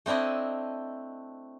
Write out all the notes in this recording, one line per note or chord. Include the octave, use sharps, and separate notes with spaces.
A3 C4 D4 E4 D#5